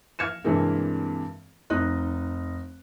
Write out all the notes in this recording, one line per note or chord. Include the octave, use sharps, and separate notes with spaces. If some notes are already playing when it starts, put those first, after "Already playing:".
F5 F6 G#6 C#7 E7
G2 C3 E3 G#3 A#3 C4
F1 D#4 D#5 F#6